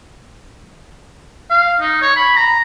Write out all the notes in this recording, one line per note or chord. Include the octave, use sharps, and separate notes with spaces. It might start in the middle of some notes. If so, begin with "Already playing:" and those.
F5
D#4
C#5
B5
A#5